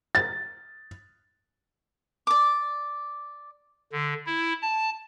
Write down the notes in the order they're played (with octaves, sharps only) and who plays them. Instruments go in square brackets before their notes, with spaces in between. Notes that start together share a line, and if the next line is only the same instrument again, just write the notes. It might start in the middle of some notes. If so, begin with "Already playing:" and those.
[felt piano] A6
[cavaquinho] D5 D6
[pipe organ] D3
E4
A5